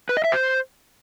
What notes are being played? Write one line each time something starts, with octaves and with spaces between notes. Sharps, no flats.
B4
D#5
E5
C5